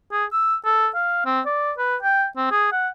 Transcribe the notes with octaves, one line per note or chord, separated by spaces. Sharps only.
G#4
E6
A4
F5
C4
D5
B4
G5
C4
G#4
F#5